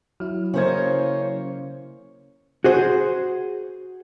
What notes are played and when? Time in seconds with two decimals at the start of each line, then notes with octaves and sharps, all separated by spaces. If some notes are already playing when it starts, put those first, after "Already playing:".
0.20 F#3 E4 F6
0.54 C#3 A#3 C#4 C5 C#5 D#5 G#6
2.64 F#4 G#4 C5